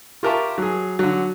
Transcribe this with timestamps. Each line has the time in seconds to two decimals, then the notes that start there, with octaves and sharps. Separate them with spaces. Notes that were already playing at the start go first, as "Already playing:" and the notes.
0.23 F4 G4 A#4 E5 A5 C#6
0.58 F#3 G#4
0.99 D3 F#3